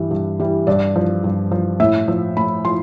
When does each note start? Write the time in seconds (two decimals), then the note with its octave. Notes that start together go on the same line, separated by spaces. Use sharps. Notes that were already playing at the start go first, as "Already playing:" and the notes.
Already playing: G2 E3 G3
0.11 G2
0.40 E3 G3
0.67 G2 D5
0.96 F3
1.24 G2
1.52 F3
1.80 A2 E5
2.08 F3
2.37 A2 B5
2.65 F3 C6